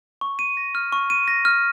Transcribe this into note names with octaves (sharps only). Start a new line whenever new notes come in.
C#6
D#7
A#6
F6
C#6
D#7
A#6
F6